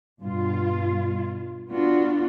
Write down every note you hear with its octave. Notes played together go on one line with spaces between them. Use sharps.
G2 B2 F4
B3 D4 F4 F#4